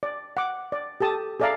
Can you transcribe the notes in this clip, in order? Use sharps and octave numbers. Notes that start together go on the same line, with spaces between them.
D5
F#5 D6
D5
G4 A4 A5 D#6
G#4 A4 D5 E5 F5 A#5